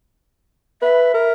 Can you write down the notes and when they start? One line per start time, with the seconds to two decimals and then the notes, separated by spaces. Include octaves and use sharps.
0.82 B4 E5
1.14 A#4